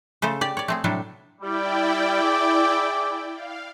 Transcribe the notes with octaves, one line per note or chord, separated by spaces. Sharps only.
C#3 A3 A4 C5
G4 D5
C#5 D5
A3 C4 G#4
A2 C3 F#3 G3 D4 A4
G3 E4 D5 G5
G#4 E5 D6
F5